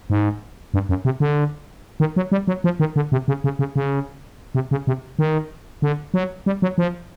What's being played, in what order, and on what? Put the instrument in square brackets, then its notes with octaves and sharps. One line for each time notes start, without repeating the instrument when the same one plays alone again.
[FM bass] G#2
G2
F#2
C3
D3
D#3
F#3
G3
F#3
F3
D#3
D3
C3
C#3
C#3
C#3
C#3
C3
C#3
C3
D#3
D3
F#3
G3
F#3
F3